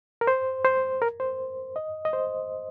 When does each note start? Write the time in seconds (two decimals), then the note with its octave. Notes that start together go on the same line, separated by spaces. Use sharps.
0.21 A#4
0.27 C5
0.65 C5
1.02 A#4
1.20 C5
1.76 D#5
2.05 D#5
2.13 C5